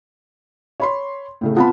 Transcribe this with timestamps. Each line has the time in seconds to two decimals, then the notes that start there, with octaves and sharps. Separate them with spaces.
0.80 C#5 B5 C6
1.41 A2 C#3 A3
1.57 B3 C4 F4 F#5 A5 B5